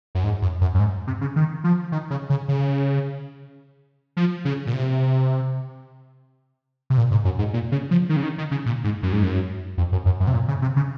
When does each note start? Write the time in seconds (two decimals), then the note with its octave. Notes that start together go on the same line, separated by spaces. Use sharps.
0.15 F#2
0.24 G#2
0.42 F#2
0.61 F#2
0.75 F#2
0.79 G#2
1.07 C3
1.21 C#3
1.36 D#3
1.64 F3
1.92 D#3
2.10 C#3
2.30 C#3
2.48 C#3
4.17 F3
4.45 C#3
4.67 A#2
4.73 C3
6.90 C3
6.97 A#2
7.11 G#2
7.25 F#2
7.39 G#2
7.53 A#2
7.72 C#3
7.91 F3
8.09 D#3
8.16 C#3
8.23 D#3
8.38 D#3
8.51 C#3
8.66 A#2
8.84 G#2
9.03 F#2
9.12 G#2
9.23 F#2
9.78 F2
9.92 F#2
10.06 F#2
10.20 F#2
10.27 C3
10.33 A#2
10.48 C#3
10.62 C3
10.76 C#3